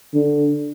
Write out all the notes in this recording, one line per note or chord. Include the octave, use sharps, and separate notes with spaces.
D3